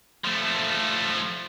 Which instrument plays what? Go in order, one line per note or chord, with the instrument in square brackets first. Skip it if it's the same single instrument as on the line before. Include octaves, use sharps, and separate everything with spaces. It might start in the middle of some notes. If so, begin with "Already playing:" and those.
[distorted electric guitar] F3 A3